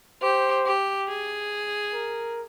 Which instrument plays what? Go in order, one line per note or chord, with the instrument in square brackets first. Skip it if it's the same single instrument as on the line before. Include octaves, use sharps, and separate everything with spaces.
[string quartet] G4 [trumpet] C5
[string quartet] G4
G#4
[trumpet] A#4